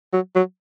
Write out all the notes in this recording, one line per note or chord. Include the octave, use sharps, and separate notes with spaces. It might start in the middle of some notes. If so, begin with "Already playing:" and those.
F#3
F#3